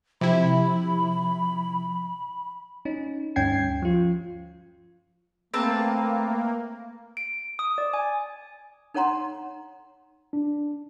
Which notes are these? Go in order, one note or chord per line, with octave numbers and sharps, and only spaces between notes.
C3 F3 E4 B5
C#4 D#4
D2 G2 C#4 G5 G#6 C7
F3 F4
A3 A#3 C4 B4 A5
D7
D#6
D5
G#5
D#4 A4 C#5 F#5 A#5 C6
D4